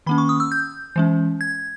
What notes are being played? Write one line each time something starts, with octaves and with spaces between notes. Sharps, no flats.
D#3 A#3 C#4 B5
C#6
D#6
E6
G6
E3 G#3 C#4
G#6